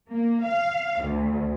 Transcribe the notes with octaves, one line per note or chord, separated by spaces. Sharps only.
A#3
F5
D2